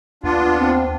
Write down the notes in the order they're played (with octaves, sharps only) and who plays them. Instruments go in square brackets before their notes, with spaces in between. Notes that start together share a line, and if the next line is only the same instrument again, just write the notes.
[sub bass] D#2 [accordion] B3 D4 F4
[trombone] C4